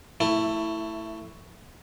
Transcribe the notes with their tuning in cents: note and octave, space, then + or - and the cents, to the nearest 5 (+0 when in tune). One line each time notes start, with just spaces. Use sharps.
A3 +15 E4 +0